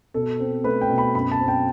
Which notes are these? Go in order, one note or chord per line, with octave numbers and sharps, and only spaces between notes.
B2 A4
C4
A3 B4
G5
B2
B5
F#2 B5
A5
C4
G5